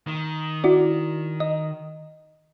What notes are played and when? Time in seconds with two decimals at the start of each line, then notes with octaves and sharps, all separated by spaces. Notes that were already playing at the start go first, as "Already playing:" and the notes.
0.07 D#3
0.64 E4 F#4 D5
1.40 D#5